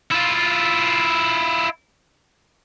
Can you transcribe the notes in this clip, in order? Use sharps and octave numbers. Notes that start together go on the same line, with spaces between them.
E4 F4